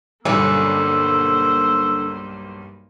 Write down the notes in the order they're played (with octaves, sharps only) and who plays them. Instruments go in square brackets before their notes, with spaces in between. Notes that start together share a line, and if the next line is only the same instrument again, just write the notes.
[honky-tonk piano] B1 G2 [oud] D3 C#4 [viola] A#3 C5 [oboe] E6